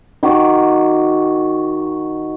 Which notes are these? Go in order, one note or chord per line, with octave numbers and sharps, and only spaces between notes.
D#3 F#4 D6